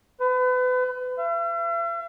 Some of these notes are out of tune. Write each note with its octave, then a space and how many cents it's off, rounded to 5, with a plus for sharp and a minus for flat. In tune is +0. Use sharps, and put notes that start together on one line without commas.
B4 +35
E5 +45